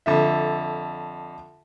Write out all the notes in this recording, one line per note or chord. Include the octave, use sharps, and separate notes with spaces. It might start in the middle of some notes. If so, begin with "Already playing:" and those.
F2 D3 E5